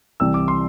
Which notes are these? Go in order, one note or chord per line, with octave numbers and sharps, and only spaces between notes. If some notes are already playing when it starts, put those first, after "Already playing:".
C2 C3 E3 E6
D6
C6